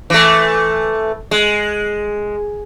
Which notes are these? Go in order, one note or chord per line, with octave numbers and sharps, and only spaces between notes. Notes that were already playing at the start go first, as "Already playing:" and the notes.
E3 A3
G#3